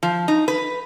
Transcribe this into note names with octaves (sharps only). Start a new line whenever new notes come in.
F3
D#4
B4